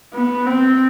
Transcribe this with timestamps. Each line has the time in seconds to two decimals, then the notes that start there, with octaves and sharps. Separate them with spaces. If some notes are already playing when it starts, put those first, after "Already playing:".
0.14 B3
0.46 C4